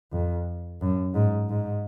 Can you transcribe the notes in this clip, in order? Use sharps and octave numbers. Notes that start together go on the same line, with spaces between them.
F2
F#2
G#2
G#2